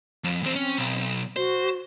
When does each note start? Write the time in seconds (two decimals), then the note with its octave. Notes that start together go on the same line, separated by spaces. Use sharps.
0.24 F2
0.43 E2 C4
0.55 C4 C#4
0.78 B1
1.36 F#4 C5